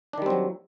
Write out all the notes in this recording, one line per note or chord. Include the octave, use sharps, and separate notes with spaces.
D#3 F#3 G3 C4 D4